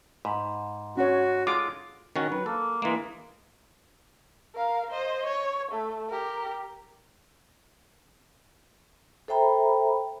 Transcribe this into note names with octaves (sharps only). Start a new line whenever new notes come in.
G#2 B5
C#4 F#4 C#5
G#3 F4 A4 D6
D#3 C#4 F#4
F#3 B4
A#3 A4
E3 G#3 A#3
A#4 F5
C5 D#5
C#5
A3
G4 A#4
A4 C5 E5 G5 A#5 B5